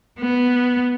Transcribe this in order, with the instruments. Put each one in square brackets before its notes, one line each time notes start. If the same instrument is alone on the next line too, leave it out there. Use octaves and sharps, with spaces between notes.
[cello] B3